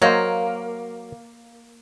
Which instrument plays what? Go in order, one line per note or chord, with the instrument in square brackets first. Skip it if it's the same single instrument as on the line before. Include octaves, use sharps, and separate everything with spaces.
[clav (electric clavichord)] F#3 C5 [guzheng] A#3 [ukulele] C#5 D#5 F5